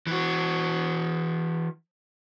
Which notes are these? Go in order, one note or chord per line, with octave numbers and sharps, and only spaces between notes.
E3 F#4